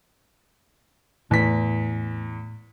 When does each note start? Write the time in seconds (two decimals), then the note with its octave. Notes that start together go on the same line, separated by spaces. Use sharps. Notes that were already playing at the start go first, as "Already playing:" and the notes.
1.31 E2 A2 B6